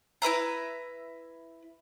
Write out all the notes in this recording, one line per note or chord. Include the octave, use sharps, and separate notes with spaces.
E4 B4 E5 A#5